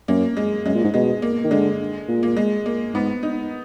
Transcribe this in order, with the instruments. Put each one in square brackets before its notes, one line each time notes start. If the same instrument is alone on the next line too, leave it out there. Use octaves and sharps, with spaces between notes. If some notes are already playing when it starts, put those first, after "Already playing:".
[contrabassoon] F#2 [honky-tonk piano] A#3
[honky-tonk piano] G#3
[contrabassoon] F#2 [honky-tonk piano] G#3
[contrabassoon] A#2
G#2
[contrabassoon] B2 [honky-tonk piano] G#3
[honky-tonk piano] A#3
[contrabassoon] D#3
[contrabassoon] D3 [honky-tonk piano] G#3
[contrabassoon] A#2
[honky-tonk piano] A#3
G#3
A#3
[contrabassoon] G#2 [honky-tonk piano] B3
[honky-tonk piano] D#4